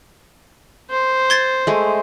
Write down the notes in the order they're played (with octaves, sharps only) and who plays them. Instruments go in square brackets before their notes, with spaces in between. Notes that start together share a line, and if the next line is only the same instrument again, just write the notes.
[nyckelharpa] C5
[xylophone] C6 G#6 A6
[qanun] G#3 A3